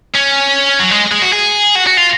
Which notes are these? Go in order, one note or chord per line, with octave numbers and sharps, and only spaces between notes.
C#4
F#3
G#3
G#3
F#4
G#4
F#4
F#4
F4